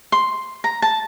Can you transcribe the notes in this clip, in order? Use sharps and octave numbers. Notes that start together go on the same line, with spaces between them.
C6
A#5
A5